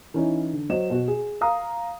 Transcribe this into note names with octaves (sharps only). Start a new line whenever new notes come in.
E3 C#4 D#4 E4
D3
F#3 C5 D#5 E7
B2 F#4
G#4
F5 A#5 D#6